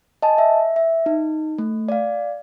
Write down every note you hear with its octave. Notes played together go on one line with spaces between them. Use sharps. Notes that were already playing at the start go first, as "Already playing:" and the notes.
D#5 G#5 A5
E5
E5
D#4
A3
D5 F5